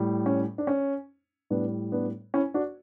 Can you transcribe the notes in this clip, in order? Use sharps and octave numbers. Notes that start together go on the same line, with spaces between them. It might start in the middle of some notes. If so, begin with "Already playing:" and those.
Already playing: A2 G3
C#4
D4
C#4
A2 G3 B3 D4
B3 D4
C#4 E4
D4 F#4